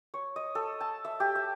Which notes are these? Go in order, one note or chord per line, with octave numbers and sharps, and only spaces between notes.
C#5
D#5
A4
A5
E5
G4
E5